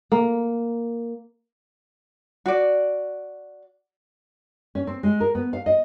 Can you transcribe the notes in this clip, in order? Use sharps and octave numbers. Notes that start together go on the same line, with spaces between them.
A#3
F#4 D5
C#4
C4
G#3
A#4
B3
F5
D#5